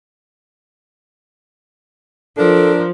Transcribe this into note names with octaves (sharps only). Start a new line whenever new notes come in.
F3 D4 A4 A#4